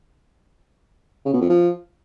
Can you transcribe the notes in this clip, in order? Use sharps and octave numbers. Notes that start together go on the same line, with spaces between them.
C#3
B2
F2
F3